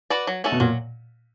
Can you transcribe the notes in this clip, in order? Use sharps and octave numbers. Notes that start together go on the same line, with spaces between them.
F#4 B4 D5
F#3
A3 C#4 F#4 A4
B2
A#2 F#3